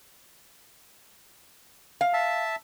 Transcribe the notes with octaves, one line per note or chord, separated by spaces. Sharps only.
F5
E5 A5